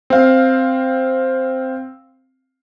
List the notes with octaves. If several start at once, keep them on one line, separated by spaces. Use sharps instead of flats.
C4 F5